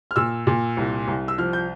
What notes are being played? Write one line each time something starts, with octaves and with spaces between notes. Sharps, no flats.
F6
A#2 E6
A#2
C2
C2
E6
F3 F6
G6